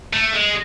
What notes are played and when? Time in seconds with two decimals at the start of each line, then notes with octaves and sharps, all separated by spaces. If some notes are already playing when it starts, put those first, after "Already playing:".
0.13 A3
0.33 G#3